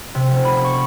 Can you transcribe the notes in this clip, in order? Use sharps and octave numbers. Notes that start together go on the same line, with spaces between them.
C3
F1
B5
C#6